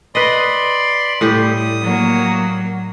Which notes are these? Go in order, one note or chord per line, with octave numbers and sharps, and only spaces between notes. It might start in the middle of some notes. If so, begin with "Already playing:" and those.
B4 D5 D#5 B5 C6
A2 G3 G4 D#6
F#3 A#3